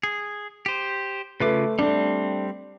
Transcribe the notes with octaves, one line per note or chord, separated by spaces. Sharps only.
G#4
G4 C5
C#3 A3 F4 B4 D6
G3 A3 C4 D4